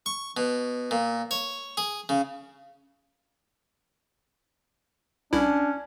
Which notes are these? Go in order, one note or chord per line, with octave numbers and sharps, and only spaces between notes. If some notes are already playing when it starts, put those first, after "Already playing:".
C#6
B2
A#2
C#5
G#4
C#3
C2 C#4 D4 E4